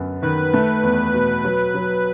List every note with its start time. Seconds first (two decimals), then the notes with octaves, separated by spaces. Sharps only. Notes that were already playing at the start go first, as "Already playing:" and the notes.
Already playing: F#2 D3 B3
0.22 D#3 B4
0.54 A3
0.83 E2
1.14 B2
1.44 F#3
1.74 F#3